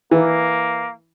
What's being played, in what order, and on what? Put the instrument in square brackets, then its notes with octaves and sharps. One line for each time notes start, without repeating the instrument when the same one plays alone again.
[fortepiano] E3 [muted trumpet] A#3